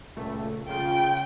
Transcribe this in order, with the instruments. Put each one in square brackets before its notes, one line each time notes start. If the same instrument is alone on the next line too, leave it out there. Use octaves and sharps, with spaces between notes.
[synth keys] C#2 A#2 A3
[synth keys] C#3 F4 [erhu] G5